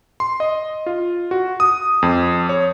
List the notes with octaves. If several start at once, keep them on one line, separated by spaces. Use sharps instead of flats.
C6
D#5
F4
F#4
D#6
F2
C#5